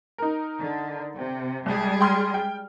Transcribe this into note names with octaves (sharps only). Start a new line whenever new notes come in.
D#4 A#4
D3
C3
C2 G3 G#3 G#4
G5 C6 F6
G5